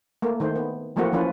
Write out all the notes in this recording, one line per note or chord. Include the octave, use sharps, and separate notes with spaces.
A3 A#3
D#3 A3 C5
B3
E3 F3 A3 A#3 C4 F#4
E3 F3 C#4 F4 B4